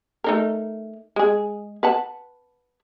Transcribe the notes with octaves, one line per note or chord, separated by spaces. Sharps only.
A3 D#4 A#4
G#3 G#4
B4 F#5 A5